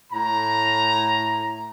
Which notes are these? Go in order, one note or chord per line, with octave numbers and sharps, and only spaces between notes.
A2 A#5